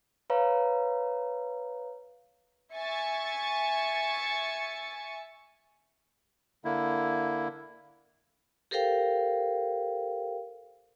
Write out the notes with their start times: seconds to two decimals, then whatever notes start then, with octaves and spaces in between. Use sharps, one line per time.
0.30 B4 C#5 F5 A#5
2.75 E5 G#5 C#6 A6 C#7
6.65 D3 A#3 E4
8.71 G4 A4 A#4 C5 F5 G5